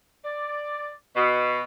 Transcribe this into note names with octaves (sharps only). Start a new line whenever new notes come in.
D5
B2